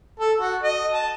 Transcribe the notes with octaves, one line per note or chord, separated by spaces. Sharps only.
A4
F#4
D#5
A5